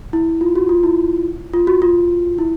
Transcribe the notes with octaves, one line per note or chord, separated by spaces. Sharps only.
E4
F4
F#4
F4
E4
F4
F#4
F4
E4